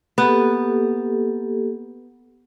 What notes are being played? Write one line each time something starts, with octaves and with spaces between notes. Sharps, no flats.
A#3 B3 G4 A4